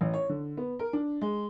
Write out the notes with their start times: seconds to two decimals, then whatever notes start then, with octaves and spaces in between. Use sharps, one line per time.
0.01 A1
0.14 C#5
0.29 D3
0.57 B3
0.79 A#4
0.93 D4
1.21 G#3